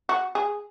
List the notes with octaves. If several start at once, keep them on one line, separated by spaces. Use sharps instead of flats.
F#4
G#4